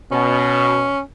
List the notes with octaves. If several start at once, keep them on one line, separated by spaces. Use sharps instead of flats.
B2 C#4